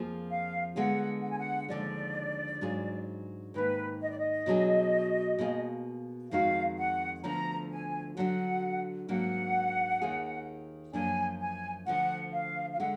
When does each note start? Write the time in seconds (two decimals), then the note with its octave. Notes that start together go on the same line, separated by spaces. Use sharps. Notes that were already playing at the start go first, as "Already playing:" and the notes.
Already playing: F2 F3 A#3 F4 G#4
0.30 F5
0.76 D3 G#3 B3 F4 G#4 F#5
1.22 F#5
1.30 G#5
1.38 F#5
1.68 D#2 D3 F3 G#3 D5
2.61 G#2 F#3 D4 F4 G#4
3.54 G#2 D#3 A#3 B4
4.00 D#5
4.10 D5
4.18 D#5
4.46 B2 F#3 D4 G#4
5.39 B2 A#3 F4 G#4
6.31 F2 D#3 G#3 D#4 F#4 F5
6.78 F#5
7.24 D2 D3 F3 B3 D4 A#5
7.70 G#5
8.16 D3 F#3 D4 F#4 F#5
9.08 G#2 F#3 A#3 D4 F#5
10.01 D#2 D#3 A#3 F4 G#4
10.93 F#2 F3 A#3 D4 G#5
11.40 G#5
11.86 D2 D3 F3 F#5
12.33 F5
12.73 F5
12.78 D3 G#3 F#5